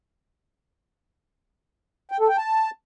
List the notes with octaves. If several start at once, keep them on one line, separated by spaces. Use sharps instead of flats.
G5
A4
G5
A5